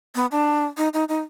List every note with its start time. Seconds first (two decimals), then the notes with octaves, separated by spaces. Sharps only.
0.15 B3
0.31 D4
0.77 D#4
0.93 D#4
1.09 D#4